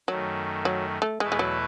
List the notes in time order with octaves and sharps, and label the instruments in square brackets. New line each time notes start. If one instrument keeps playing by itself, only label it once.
[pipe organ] F#2 D#3 A3 [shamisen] F#3
[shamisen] F#3
A3
[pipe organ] E2 B2 A3 E4 B4 [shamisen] G#3
[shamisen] G#3
F#3